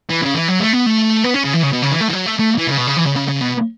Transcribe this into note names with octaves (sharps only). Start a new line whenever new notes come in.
E3
C#3
E3
F#3
A3
B3
A3
B3
C#4
C#3
E3
C#3
B2
C#3
E3
A3
E3
F#3
A3
A3
E3
C#3
B2
C#3
E3
C#3
C#3
C#3
B2